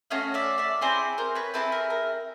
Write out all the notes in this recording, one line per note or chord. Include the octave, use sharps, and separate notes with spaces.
A3 C#4 F#4 D#5 F5
D5 E5
D5 E5
C4 E4 G#4 C5 D5
A#4 C5
B4 C#5
C4 E4 G#4 A4 B4
A#4
A#4